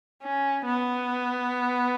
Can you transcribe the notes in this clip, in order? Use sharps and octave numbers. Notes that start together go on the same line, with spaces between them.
C#4
B3